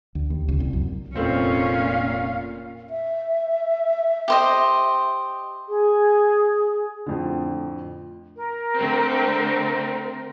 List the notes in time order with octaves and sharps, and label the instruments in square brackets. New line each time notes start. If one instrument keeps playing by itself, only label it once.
[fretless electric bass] D2
D#2
C#2
C2
F#2
[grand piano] F1 A3 C4 [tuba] A#2 [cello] C#4 [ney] F5
[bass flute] E5
[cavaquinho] G4 C5 D#5
[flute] G#4
[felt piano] F2 A2 D3
[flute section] A#4
[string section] D3 A3 C4